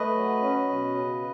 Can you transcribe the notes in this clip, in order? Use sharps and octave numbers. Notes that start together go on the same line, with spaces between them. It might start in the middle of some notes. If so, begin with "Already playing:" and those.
Already playing: A3 B4 D#5
F#3
C#4
B2
C#3